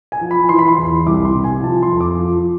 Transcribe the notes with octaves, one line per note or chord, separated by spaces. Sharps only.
G#5
F3
B5
E3 C6
B5
C6
E2
C2 D6
C6
C3
G#5
F3 A5
C6
F2
D6
F3